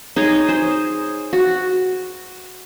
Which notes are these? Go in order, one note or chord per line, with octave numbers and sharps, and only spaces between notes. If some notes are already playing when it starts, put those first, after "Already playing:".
D#4 G#4 C#5
G#4 C5
F#4